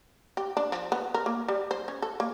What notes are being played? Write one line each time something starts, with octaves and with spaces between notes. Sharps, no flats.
G4
D4
F3
B3
A#4
A#3
G3
C5
C#4
A4
A#3